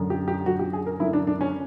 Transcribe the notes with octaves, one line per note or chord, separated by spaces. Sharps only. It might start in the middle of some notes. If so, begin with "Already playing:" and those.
Already playing: F#2 D3
G4
G4
F#2 D3 F#4
G4
G#4
A#4
F#2 D3 E4
D4
D4
C#4